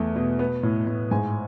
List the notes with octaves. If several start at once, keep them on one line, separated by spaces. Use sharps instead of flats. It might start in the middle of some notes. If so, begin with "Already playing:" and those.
Already playing: E2 A3
B2
B3
A2
A2
G#2 G#5